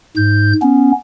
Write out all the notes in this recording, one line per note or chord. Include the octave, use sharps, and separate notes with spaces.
G#2 G6
B3 C#4